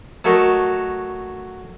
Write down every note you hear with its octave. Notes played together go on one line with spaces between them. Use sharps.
F#3 A3 F#4 A4 A#4 D#5